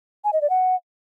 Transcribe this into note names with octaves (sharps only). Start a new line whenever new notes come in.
G#5
D#5
D5
F#5